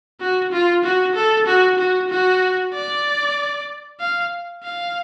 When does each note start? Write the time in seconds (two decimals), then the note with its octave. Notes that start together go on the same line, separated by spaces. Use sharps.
0.20 F#4
0.52 F4
0.84 F#4
1.15 A4
1.47 F#4
1.79 F#4
2.10 F#4
2.73 D5
4.00 F5
4.63 F5